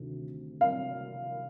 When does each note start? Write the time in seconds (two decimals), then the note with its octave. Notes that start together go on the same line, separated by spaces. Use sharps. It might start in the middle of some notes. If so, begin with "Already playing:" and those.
Already playing: D2 C3 D#3
0.61 F5